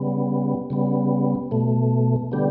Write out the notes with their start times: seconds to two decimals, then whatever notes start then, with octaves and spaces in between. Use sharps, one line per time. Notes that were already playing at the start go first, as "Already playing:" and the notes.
Already playing: C#3 G3 B3
0.70 C#3 G3 B3
1.51 B2 A3
2.32 D3 G3 B3 G4